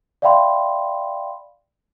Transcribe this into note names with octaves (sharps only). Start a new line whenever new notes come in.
D5 E5 F5 G5 B5 C6